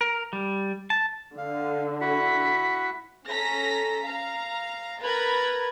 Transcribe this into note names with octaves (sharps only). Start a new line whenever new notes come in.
A#4
G3
A5
D3 F5
E4 F#4 F#5 B6
C#4 A4 A#5 A#6 B6
F5 A#5
A#4 B4 A#5 B5 G#6 A6